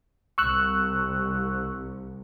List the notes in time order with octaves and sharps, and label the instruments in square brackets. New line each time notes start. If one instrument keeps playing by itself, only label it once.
[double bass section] C2 [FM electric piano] C#6 E6 F#6